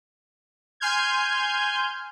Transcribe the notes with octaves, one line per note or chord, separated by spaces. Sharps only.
G#5 C6 F6 G6 G#6